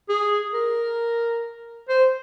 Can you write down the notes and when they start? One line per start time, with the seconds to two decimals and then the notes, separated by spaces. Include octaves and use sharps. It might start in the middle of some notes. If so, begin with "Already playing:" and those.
0.09 G#4
0.54 A#4
1.89 C5